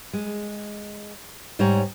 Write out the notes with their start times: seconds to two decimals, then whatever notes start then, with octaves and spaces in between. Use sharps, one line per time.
0.13 G#3
1.59 G#2 G3 C5 C#5 G#5 A#5